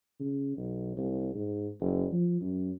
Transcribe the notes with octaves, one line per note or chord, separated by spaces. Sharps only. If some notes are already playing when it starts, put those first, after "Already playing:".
C#3
B1
C2
G#2
F#1
F3
F#2